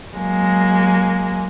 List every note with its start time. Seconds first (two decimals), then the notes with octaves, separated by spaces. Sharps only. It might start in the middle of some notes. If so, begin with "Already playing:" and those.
0.15 F#3 G#3 A#3